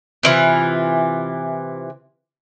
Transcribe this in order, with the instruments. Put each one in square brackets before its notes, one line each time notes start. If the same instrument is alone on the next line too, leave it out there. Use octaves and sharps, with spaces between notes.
[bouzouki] C3 E3 F4